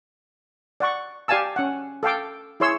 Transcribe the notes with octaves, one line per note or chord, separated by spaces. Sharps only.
D5 F#5 C#6
G4 D5 F5 G#5 A5 E6
C#4 F#5
A4 F5 G5 D6
E4 G#4 C#5 C6 E6